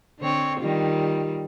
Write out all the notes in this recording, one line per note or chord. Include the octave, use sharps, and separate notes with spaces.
D3 C4 C#5
D#3 G3 F4